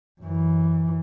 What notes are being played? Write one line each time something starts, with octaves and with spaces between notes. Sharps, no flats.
F#2 E3